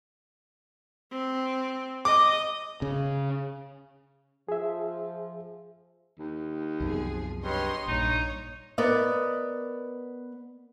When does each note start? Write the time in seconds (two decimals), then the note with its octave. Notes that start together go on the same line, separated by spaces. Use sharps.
1.12 C4
2.05 D#5 D6
2.82 C#3
4.49 F3 G#4 E5
6.19 D#2
6.80 C2 F#2 F3 B3 G#4
7.44 G2 C#5 D#5 C6
7.88 A#1 G2 D#4 C#5
8.78 B3 A#4 D5 D#5